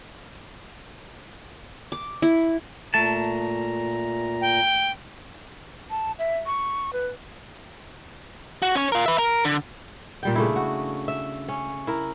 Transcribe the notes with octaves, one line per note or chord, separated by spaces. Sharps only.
D6
E4
A#2 A3 A5 A#5
G5
A5
E5
C#6
B4
F#4
C#4 C#5
F4 A#4
B4 E5
A#4
D3
A#2 G3 G5
C#3 A3 D4 E4
F#4
E5
C#4
E4 A#4